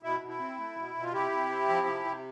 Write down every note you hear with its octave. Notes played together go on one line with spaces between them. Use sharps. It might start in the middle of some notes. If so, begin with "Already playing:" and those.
B2 E4
B2
E4
C4
A3
B2
B2
F4
C3 E4 G4
C3
C4
F3
C3
C3